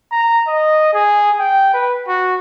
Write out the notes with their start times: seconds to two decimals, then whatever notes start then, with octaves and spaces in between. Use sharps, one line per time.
0.12 A#5
0.48 D#5
0.93 G#4
1.39 G5
1.74 B4
2.08 F#4